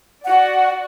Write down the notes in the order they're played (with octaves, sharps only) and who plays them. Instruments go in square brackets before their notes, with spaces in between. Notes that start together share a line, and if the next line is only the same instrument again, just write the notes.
[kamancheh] F#4 D5 [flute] F#5